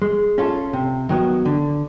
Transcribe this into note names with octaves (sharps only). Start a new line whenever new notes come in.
G#3
C#4 F4 A4
C3
D#3 F#3 B3
D3